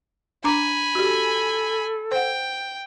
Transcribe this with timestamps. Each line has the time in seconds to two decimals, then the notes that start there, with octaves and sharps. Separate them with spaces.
0.44 D4 G#5 A#5 B5 D6
0.95 F#4 G4 A4
2.12 C5 F#5 G5